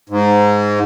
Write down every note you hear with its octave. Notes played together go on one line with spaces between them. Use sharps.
G#2